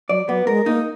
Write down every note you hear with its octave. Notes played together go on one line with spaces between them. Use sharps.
F#3 D5
F#3 B3
G#3 A#4
A#3 D#4